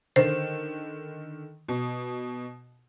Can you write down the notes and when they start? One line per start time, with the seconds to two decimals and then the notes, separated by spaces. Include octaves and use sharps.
0.16 D3 D#3 C5
1.68 B2